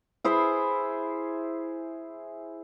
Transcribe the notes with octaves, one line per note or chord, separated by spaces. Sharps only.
E4 G#4 C5 E5